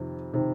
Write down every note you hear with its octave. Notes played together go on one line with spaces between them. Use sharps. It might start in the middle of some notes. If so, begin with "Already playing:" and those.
Already playing: F2 C3 D#3
C3 D#3